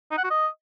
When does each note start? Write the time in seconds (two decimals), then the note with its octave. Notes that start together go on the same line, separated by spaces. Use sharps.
0.12 D#4
0.18 F#5
0.24 F#4
0.30 D#5